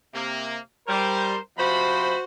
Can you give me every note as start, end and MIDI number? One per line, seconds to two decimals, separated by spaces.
0.14 0.59 48
0.14 0.59 58
0.88 1.33 55
0.88 1.39 70
0.88 1.39 72
1.57 2.14 48
1.57 2.14 53
1.57 2.24 66
1.57 2.24 72
1.57 2.14 83